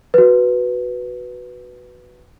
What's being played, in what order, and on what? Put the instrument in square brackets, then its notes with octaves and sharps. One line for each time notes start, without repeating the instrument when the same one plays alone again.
[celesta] F#4 B4